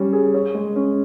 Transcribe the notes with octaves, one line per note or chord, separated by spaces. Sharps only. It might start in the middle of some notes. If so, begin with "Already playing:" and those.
Already playing: G3 C#4
G#4
C#5
G#3
C#4